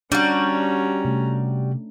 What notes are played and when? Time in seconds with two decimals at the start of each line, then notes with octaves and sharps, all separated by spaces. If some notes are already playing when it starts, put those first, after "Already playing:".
0.12 G3 C#4 D4 F#4 A#5
1.05 C3 A3